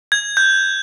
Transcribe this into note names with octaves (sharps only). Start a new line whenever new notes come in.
G#6
G6